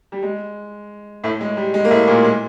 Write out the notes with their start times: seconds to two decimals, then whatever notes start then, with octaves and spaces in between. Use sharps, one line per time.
0.12 G3
0.23 G#3
1.24 A2 A3
1.41 G#3
1.57 G3
1.74 G#3
1.85 A#3
1.91 A2 A3
2.07 A#2 A#3
2.24 G#3